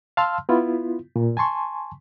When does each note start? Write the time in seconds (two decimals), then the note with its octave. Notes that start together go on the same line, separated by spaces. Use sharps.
0.17 F5 A5 C6 E6 F6
0.49 B3 E4 F4
1.16 A#2
1.37 G#5 A5 C6 C#6